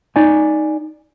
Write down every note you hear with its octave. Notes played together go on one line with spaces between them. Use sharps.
D#4 D5 G#5